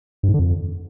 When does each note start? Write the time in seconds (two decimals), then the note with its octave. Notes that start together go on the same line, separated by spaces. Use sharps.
0.23 G2
0.29 G#2
0.34 D3
0.39 F2